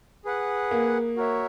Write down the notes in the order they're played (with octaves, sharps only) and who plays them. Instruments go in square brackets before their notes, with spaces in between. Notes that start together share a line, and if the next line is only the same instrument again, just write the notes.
[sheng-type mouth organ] G#4 B4 F#5
[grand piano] A#3
[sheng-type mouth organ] F#4 A#4 C#5 E5